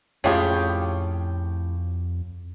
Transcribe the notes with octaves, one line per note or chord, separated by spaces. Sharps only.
F2 A2 C#4 F4 G4 G#4